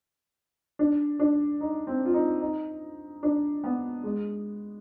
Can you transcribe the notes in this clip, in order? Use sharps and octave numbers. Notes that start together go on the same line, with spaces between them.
D4
D4
D#4
C4
F4
D#4
D#4
D4
B3
G#3